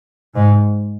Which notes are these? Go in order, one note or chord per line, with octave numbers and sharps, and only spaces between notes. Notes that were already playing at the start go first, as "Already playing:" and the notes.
G#2